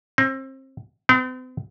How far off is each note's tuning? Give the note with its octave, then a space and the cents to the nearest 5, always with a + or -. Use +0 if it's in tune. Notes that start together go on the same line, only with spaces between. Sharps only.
C4 +30
C4 -45